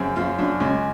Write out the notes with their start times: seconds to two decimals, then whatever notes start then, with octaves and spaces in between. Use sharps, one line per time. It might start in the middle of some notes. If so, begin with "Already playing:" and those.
Already playing: F#2 C#3 C4
0.16 F#2 F4
0.39 F#2 D4
0.60 C#2 C#4